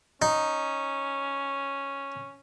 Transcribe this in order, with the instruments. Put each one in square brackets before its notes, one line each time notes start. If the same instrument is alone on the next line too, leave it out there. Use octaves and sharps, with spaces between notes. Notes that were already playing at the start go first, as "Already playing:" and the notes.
[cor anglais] C#4 [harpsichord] D#4